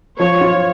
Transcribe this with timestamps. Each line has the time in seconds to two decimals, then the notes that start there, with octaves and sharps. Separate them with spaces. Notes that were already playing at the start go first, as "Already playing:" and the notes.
0.19 F3 C#5
0.41 F4